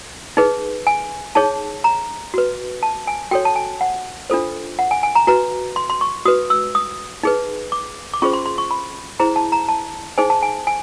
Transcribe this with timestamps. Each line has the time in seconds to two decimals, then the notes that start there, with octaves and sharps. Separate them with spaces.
0.37 D#4 G#4 B4
0.87 G#5
1.35 D#4 G#4 C#5 A5
1.84 A#5
2.34 F#4 B4
2.83 A5
3.07 G#5
3.31 F#4 A4 C#5 G5
3.45 A5
3.56 G#5
3.81 F#5
4.30 D4 F4 A4 C5
4.79 F#5
4.91 G#5
5.03 G#5
5.15 A#5
5.27 F#4 B4 A#5
5.76 C6
5.90 C6
6.01 C#6
6.25 F#4 B4 D#6
6.50 E6
6.75 D#6
7.23 D#4 G#4 B4
7.72 D6
8.14 D6
8.22 C#4 F4 G#4 C5 C#6
8.33 C6
8.46 C6
8.58 C#6
8.71 B5
9.20 E4 G#4 C5 A#5
9.36 A5
9.52 A#5
9.69 A5
10.18 D#4 G#4 C5 G#5
10.30 A5
10.43 G#5
10.67 G#5